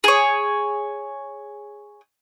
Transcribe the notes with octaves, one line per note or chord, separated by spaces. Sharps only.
G#4 C#5